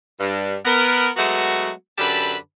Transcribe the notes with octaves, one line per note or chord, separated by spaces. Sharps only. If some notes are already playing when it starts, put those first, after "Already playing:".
G2
B3 A#4
F#3 G#3 A3 B3 F#4
F#2 D3 G4 B4 A5 B5